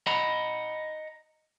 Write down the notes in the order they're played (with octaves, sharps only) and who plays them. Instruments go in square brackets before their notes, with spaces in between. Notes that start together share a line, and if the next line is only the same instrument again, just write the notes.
[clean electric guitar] D#5 F#5 A#5 B5